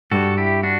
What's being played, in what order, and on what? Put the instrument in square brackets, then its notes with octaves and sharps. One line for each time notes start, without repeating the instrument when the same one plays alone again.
[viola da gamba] G2 [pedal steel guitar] F#4 A4
[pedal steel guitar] E4 G4
D4 F#4